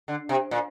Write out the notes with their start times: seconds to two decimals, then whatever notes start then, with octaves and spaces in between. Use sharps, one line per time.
0.08 D3
0.29 C3
0.51 A#2